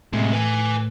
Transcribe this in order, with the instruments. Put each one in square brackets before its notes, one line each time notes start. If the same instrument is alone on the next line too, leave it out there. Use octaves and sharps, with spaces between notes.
[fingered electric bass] A2 [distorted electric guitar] C3 G#3
[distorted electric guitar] B4 G#5